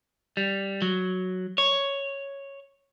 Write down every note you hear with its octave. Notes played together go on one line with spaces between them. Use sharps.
G3
F#3
C#5